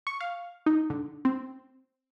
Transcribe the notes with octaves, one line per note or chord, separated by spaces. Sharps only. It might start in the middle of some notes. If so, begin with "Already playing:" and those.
C#6
F5
D#4
D3
C4